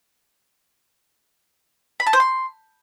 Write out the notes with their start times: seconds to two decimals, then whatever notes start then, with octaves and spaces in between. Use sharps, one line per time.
2.00 B5
2.07 A5
2.13 C5
2.20 C6